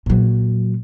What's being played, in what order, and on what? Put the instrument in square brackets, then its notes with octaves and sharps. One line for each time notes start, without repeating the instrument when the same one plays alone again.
[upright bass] A#2 F#3